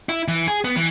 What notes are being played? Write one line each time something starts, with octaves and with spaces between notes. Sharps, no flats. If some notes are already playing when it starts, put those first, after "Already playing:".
E4
E3
G#4
B3
E3